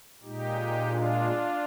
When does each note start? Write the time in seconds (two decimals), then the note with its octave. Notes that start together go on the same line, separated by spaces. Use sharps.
0.23 A#2 G#3 D#4 G4
0.89 D4 F4